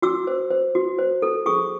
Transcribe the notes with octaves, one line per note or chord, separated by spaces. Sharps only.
F#4 D6 E6
C5
C5
F#4
C5
A4
G#4 C#6 D#6